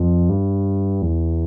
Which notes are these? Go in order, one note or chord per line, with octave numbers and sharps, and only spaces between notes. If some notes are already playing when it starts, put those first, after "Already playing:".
Already playing: F2
G2
E2